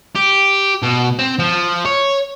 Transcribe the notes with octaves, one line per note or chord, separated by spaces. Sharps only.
G4
B2
C4
F3
C#5